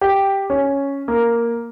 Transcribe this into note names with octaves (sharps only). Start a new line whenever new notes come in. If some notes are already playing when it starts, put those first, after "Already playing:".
G4
C#4
A#3